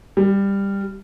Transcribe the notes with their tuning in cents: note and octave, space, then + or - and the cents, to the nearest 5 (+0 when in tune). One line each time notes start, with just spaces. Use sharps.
G3 +15